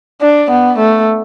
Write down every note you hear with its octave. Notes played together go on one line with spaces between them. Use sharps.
D4
B3
A3